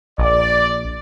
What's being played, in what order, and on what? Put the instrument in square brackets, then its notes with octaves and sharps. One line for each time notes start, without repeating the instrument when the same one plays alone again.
[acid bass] A#1 [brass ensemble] D5